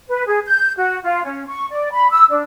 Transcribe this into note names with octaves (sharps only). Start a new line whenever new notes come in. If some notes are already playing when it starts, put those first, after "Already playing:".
B4
G#4
G6
F#4
F4
C#4
C#6
D5
B5
E6
D4